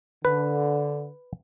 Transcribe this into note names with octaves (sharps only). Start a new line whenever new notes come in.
D3 B4